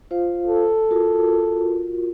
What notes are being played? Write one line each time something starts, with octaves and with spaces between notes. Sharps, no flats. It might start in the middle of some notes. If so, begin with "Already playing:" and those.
F4 C5 F5
A4
F4 F#4 A#4